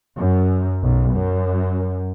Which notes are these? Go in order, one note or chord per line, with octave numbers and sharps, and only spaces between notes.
F#2
B1
F#2